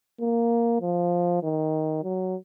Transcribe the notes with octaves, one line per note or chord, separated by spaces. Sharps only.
A#3
F3
D#3
F#3